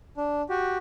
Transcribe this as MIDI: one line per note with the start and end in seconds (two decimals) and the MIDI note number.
0.17 0.42 62
0.49 0.78 66
0.49 0.78 67